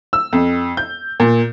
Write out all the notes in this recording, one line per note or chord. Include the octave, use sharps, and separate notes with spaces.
E6
F2
G6
A#2